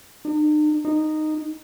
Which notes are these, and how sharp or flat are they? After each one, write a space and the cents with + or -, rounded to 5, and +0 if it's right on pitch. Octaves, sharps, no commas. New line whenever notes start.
D#4 -45
D#4 -10